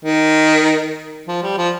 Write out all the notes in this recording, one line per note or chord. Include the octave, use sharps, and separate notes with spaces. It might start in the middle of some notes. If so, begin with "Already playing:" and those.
D#3
F3
G3
F3